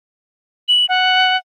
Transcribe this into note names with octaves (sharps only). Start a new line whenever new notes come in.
F#7
F#5